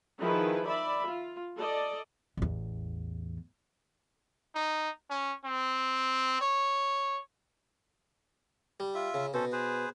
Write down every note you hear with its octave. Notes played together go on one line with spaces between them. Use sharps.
D#3 F3 E4 G#4 B4
D5 E5 B5
F4
A4 D5 D#5
A1 E2
D#4
C#4
C4
C#5
G3
F4 E5
C#3
B2 C#4 A4 C5
G#4 B4 C5